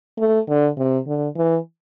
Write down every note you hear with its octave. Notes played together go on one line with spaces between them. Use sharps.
A3
D3
C3
D3
E3